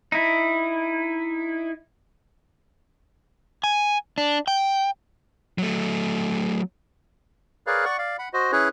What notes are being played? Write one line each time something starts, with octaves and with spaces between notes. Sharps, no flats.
D#4 E4
G#5
D4
G5
F#3 A3
G#4 A#4 B4 C#5 D5 F5
D5 F#5 C#6
D5 F5
F#5 B5
F#4 C5 D#5
C#4 E4 G#4 B4 C#5